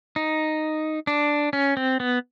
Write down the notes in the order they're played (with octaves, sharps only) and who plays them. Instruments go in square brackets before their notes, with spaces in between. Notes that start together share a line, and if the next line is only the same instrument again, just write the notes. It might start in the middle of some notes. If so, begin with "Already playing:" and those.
[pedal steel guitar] D#4
D4
C#4
C4
B3